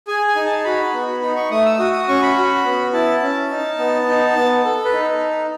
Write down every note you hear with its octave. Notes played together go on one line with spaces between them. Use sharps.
G#4 G#5
G#5
D#4
A5
F#4 B5
B3
D#4 B5
C#6
A3 D#6
E6
F#4 D#6
D#6
C#4 C#6
B5
F#4
B3
E4 A5
C#4
D#4
B3
D#4
B3
A4
B4
D#4